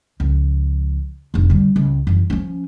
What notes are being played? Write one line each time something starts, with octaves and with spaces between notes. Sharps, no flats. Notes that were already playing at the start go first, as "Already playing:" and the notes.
C#2 F3
F1 A#1
D3 G3
C#2
F#2 E3
F3 C#4